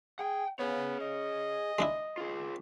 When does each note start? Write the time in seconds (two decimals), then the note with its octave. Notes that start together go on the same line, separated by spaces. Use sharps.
0.19 G#4 F#5 G5
0.59 B3 G#4 C#5
1.01 D#5
1.79 G#3 D4 E4
2.18 F4 G#4